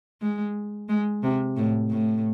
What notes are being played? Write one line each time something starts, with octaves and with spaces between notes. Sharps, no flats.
G#3
G#3
C3
A2
A2